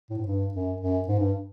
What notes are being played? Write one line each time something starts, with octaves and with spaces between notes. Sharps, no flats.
A2
G#2
G2
F#2
F#2
G#2
G2